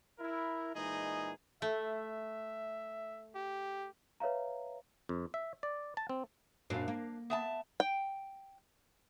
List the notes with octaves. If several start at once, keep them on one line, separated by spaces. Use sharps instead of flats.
E4 A#4
A#2 E3 G#3 D#4 G#4 D#5
A3 E5
G4
B4 C#5 E5 F5 A#5
F2
E5
D5
A5
C4
F#2 A#2 D4 F5
A#3
B3 E5 A5
G5